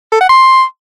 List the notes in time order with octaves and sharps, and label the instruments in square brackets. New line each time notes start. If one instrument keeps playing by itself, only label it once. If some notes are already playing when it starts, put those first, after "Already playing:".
[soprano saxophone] A4
F#5
C6